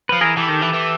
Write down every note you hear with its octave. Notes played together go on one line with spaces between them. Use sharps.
F3 B4
E3 G#4 A#4
E3 G4 A4
D#3
E3
E3